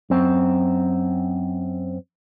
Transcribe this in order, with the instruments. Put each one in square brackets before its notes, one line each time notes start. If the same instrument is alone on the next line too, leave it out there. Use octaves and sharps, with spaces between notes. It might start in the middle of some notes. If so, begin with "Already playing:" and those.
[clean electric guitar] F#2 C4